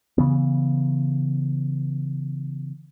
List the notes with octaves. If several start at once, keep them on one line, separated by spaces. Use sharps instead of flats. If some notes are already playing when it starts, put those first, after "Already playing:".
C#3 E3 B3